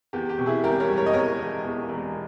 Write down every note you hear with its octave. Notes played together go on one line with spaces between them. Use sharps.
E2 G4
G4
B2
E4 G#4
E1 G4 A#4
A#4 C#5
G3
A#4 C#5
D#5
E2 A#4 C#5
E1
E2
E1